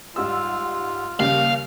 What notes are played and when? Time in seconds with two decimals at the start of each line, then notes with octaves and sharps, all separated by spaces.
0.16 G#2 G3 F4 E6
1.20 D#2 C#3 G3 F5